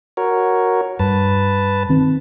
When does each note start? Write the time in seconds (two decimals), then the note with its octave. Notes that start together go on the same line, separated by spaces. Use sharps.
0.17 F#4 A#4 C#5
0.99 G2 B4 A5
1.89 D#3 C4